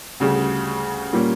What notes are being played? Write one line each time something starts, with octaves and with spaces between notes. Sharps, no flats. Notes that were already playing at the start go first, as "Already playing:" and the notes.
D2 C#3 G3
A#2 G3 A#3 C#4